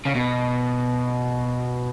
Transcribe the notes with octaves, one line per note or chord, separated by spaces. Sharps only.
C#3
B2